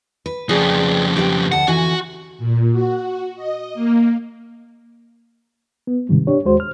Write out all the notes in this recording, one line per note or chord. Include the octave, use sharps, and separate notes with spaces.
B4
F2 C#3 G#4 B4 D5
G4 B4
D2 F#5 A5
F2 E3 F#4 G#5
A#2
F#4
D#5
A#3
B3
G#2 C3 D#3 G3
D4 G4 C#5
D#2 G#3 F#4 C5
F6